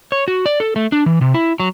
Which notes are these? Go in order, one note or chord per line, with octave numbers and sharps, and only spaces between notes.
C#5
F#4
D5
A4
A3
D4
E3
C3
E4
F#3